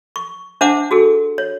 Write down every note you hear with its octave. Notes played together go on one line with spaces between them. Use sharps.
C#6
D4 C5 E5 F#5 A5 D6
F#4 G#4 A4
C#5